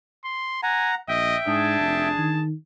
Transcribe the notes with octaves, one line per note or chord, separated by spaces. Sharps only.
C6
F#5 G#5 A#5
A#1 D#5 E5 G5
G#2 D4 G#4 A5
F1
D#3